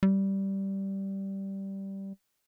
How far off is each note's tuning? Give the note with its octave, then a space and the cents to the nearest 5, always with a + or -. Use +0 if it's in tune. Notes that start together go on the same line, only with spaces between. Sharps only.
G3 -10